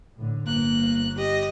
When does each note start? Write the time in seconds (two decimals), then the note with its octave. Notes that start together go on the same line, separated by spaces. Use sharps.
0.17 A2 D3
0.46 G1 A#3 F#6
1.18 G4 D#5